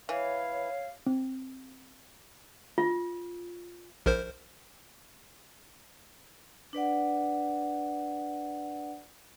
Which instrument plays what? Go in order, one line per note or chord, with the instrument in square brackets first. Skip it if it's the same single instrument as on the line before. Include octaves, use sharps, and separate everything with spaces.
[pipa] E3 [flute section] C#5 [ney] F5
[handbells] C4
[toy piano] F4
[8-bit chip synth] A#1 A#4 C5
[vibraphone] D4 B4 D5 F#5